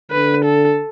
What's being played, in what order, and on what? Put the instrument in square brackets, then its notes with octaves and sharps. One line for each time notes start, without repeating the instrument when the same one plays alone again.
[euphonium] D3 [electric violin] B4
[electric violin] A4